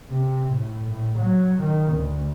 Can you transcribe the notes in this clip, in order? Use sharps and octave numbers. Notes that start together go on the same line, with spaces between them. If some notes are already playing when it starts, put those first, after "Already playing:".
C3
A2
A2
F#3
D#3
D2